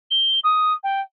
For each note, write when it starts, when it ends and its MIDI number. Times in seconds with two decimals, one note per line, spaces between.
0.11 0.40 103
0.44 0.73 87
0.83 1.01 79